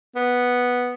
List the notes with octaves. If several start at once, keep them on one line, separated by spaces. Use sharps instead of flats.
B3